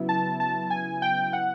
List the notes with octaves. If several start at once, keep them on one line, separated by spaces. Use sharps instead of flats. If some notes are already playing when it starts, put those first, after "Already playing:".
Already playing: C#3 F#3 B3 E4
A5
A5
G#5
G5
F#5